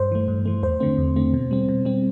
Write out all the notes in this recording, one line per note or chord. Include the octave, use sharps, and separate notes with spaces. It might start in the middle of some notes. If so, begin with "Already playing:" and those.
Already playing: G2 C5
E3 A3
G2
E3 A3
E2 C5
D3 A3 C4
E2
D3 A3 C4
B2
G3 C4
B2
G3 C4